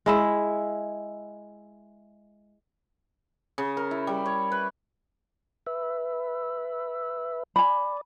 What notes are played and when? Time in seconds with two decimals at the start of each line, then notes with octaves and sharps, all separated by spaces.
0.06 G#3 E4 E5
3.58 C#3
3.77 A#4
3.91 E4
4.07 G3
4.26 C#5
4.52 B4
5.67 B4 E5
7.56 D5 G#5 B5